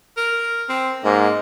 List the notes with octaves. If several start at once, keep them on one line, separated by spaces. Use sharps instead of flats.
A#4
C4
G#2 A#3